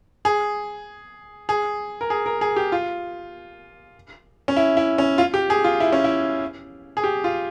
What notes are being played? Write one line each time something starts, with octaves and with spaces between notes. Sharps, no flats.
G#4
G#4
A#4
G#4
A#4
G#4
G4
F4
C#4
E4
E4
C#4
F4
G4
G#4
F4
E4
C#4
E4
G#4
G4
F4